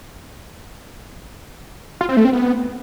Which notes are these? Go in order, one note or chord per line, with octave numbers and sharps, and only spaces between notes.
F4
C4
A3
C4
B3